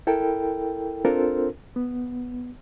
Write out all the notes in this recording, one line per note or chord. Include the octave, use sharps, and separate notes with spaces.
E4 A4 A#4 G5
C4 D4 F4 A4 A#4 C5
B3